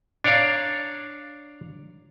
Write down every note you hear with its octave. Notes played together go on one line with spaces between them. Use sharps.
D4 C#5 D5 F5 A#5